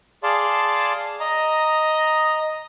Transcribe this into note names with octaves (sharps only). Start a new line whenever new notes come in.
G#4 D5 F5 A5 C6
D#5 A#5